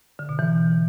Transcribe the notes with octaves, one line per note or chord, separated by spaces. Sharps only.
D3
B2
E3